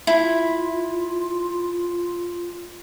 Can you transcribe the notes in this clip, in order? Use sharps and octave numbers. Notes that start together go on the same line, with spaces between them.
E4 F4